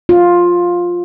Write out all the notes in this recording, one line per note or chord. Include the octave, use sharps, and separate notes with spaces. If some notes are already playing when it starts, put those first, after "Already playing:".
F4